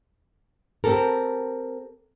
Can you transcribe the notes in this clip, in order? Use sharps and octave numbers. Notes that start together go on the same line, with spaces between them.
C4 G4 A4 A#4